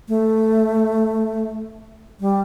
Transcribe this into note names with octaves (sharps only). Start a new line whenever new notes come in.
A3
G3